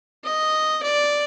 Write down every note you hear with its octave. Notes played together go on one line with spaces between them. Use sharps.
D#5
D5